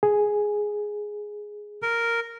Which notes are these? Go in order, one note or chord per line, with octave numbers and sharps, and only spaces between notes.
G#4
A#4